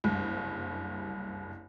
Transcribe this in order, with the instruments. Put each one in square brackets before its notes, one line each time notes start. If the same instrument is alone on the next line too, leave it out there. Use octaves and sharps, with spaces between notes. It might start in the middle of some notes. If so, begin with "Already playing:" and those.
[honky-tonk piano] F#1 C2 G2